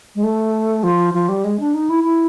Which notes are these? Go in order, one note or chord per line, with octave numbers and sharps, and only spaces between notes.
G#3
A3
F3
F3
G3
G#3
D4
D#4
E4
E4